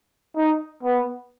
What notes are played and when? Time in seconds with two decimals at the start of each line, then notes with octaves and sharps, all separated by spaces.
0.36 D#4
0.83 B3